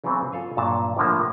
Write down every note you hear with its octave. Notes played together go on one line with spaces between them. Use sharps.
C#3 E3 F#3 B3 C4
F4 A4 F5 G#5
G2 A#2 F#3 A5 A#5
A2 D3 F3 A#3